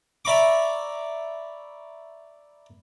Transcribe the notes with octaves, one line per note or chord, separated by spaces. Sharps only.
D5 E5 A#5 B5 C#6 D6